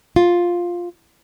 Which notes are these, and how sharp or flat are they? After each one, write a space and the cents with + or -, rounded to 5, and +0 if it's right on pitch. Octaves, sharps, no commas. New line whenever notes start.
F4 +5